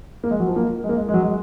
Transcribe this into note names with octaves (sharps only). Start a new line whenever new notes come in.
A#3
G#3
F#3
F3
A#3
G#3
A#3
G#3
G#3
F#3
G#3